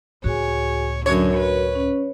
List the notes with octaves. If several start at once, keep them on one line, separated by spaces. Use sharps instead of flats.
C#2 A2 F#4 G#4 C#5 G#5
F#2 D3 F#3 F#4 A#4 C#5
B4
C#4